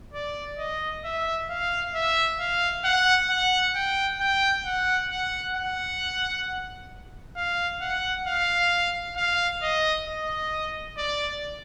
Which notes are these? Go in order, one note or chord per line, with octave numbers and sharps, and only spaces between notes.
D5
D#5
E5
F5
E5
F5
F#5
F#5
G5
G5
F#5
F#5
F#5
F5
F#5
F5
F5
D#5
D#5
D5